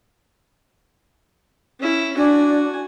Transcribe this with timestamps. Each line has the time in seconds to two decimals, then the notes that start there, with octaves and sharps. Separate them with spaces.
1.80 C#4 E4
2.17 D4 F#4 G#5